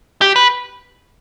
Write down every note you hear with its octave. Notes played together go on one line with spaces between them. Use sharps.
G4
B4